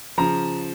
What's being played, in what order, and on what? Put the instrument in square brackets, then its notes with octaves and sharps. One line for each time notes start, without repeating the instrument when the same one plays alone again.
[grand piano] C#3 F3 A#5